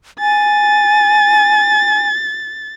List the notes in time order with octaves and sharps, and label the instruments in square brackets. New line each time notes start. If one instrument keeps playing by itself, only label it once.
[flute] G#5 [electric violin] A6